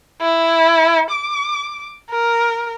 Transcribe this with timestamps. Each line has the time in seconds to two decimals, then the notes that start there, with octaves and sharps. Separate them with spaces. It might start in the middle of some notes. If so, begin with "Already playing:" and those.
0.21 E4
1.10 D6
2.10 A#4